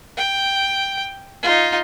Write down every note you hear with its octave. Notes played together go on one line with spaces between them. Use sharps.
G5
D#4 F4